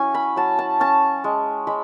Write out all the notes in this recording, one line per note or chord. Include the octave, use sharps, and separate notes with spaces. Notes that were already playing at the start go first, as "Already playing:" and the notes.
Already playing: F#3 C#4 E4 G#5
B5
F#3 A5
A5
C#4 A5
G#3
G#3 B5